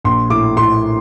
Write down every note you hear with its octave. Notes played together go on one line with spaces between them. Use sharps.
A#1 C6
A2 D6
A2 C6